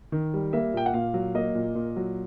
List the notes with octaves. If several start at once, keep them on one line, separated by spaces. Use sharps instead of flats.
D#3
G3
A#3 E5
A#2 G5
F#5
A#2 F5
F#3
A#3 D#5
A#2
A#2
F#3